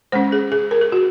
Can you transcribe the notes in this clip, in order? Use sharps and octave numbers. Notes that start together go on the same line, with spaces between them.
G#3 C#4 C5
G#4
G#4
A#4
G#4
F#4